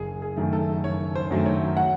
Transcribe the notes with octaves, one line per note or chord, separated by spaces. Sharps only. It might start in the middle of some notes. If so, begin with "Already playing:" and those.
Already playing: F#1 G#4
G#4
F#2 D#3 F#3 A3
A4
F#1 C#5
C5
F#2 D#3 F#3 A3
C#5
F#5